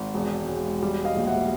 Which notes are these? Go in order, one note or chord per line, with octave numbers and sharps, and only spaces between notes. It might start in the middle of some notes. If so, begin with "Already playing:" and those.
Already playing: G#1
E1
E1
G3
D#5 F5
A#1
E5 F#5